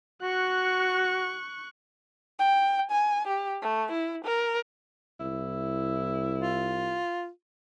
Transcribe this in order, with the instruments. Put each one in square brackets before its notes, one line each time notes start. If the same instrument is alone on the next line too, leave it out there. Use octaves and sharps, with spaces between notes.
[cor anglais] F#4 [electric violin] C#6 F#6
[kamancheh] G5
G#5
G4
A3
E4
A#4
[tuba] C2 [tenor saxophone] E4
[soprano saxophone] F4